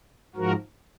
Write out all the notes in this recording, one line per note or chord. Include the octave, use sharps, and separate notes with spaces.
G#2 F3 F#4 A#4